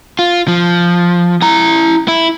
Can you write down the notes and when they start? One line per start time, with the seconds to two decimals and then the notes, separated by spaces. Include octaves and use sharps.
0.19 F4
0.48 F3
1.42 E4 A#5
2.08 E4